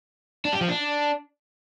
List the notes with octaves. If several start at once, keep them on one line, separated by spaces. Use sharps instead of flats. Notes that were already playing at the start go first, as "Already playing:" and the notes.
D4
G4
F3
D4